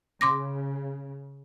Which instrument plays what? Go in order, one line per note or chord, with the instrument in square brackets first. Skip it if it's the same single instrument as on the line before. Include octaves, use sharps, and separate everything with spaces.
[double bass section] C#3 [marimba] C6 D6 A#6